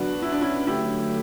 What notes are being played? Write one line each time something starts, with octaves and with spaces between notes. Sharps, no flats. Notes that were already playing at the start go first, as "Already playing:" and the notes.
Already playing: D2 D3 F#3 B3 D4 F#4
E4
D4
C#4 E4
D3 F#3 A3 E4 G4